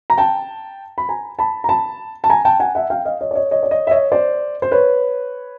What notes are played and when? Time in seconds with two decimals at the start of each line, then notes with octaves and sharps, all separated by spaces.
0.10 A#5
0.18 G5 A5
0.98 B5
1.09 G#5 A#5
1.39 A5 B5
1.64 A#5
1.69 A5 B5
2.24 A5
2.30 G#5 A#5
2.45 G5 A5
2.60 F#5 G#5
2.75 E5 F#5
2.90 F5 G5
3.05 D#5 F5
3.21 C#5 D#5
3.31 D5
3.35 C#5 D#5
3.51 C#5 D#5
3.63 D5
3.71 C#5 D#5
3.87 E5
3.91 C#5 D#5
4.12 C5 D5
4.62 C5
4.72 B4 C#5